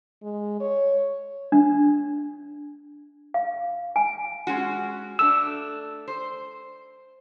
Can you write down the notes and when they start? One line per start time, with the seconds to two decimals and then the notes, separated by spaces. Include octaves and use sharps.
0.22 G#3
0.60 C#5
1.52 D4
3.34 F5
3.96 G#5
4.47 G#3 C#4 F#4
5.19 A3 D4 E6
6.08 C5